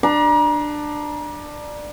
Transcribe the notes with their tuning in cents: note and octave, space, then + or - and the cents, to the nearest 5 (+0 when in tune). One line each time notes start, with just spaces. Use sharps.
D4 +15 A#5 +35